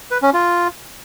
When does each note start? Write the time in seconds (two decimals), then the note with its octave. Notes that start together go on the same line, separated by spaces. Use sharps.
0.11 B4
0.22 C#4
0.33 F4